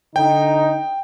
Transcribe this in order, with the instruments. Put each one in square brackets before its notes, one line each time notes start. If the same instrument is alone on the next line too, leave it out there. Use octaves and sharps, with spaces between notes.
[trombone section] D3 D#4 [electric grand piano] G5